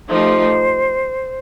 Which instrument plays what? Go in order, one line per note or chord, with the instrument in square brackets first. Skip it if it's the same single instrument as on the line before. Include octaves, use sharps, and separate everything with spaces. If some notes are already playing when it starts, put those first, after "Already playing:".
[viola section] F3 A3 D#4 G4 [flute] C5